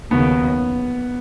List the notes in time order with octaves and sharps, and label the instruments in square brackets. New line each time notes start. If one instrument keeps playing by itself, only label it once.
[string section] D#2 C#3 F#3 [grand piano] B3